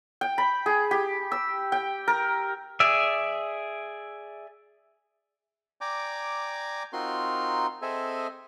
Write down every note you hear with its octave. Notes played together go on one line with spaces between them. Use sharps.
G5
B5
G#4
G4
E6
G5
A#4
G#4 D5 E5
D5 G5 G#5 A#5 D6
C4 D#4 F4 F#4 A#4 C6
C4 G#4 A4 D#5 E5 G#5